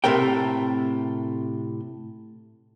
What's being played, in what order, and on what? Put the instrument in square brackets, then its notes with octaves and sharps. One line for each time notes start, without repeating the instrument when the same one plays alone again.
[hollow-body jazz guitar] A2 C3 A3 A#4 G5